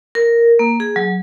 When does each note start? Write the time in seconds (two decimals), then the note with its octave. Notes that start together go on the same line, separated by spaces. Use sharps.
0.15 A#4
0.59 A#3
0.80 G#4
0.96 F#3